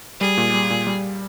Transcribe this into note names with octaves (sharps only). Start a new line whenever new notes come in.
G3 G#4
A#2
G3
A#2
G3